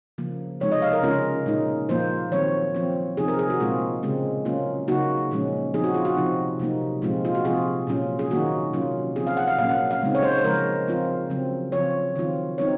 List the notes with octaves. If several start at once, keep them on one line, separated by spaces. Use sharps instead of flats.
C#3 F3 A#3
C3 F3 G#3 D#4 C#5
D#5
F5
A#4
C#3 G#3 C#4 F4 A#4
A#2 G#3 D#4
A#2 F3 A#3 F4 C5
D#3 F#3 C4 C#5
F3 C4 F4
C3 F3 C4 D#4 G#4
A#4
G#4
F#4
A#2 G#3 C4 F4
C#3 G#3 C4
F#3 A#3 C#4 F4
C#3 F#3 A#3 D#4 F#4
A#2 F3 G#3 C#4
F3 C4 D#4 G#4
F#4
F4
F#4
C3 F3 C4 D#4
C3 F#3 A#3 D#4
A#2 F3 G#3 C4 F4
F4
F#4
C3 F3 C4 F4 G#4
A#2 F#3 C#4 F4
G#4
D#3 F#3 A#3 D#4 F#4
C3 F#3 C#4 F4
F3 C4 F4 G#4
F5
F#5
F5
A#2 F#3 A#3 C#4 F5
F#5
F5
C#3 G#3 C4 D#4
C#5
C5
C5
C#3 F3 G#3 A#4
F3 C4 F4
C#3 F#3 C4
C#3 F3 C4 F4 C#5
D#3 F#3 C4 F4
F#3 C4 D#4 C#5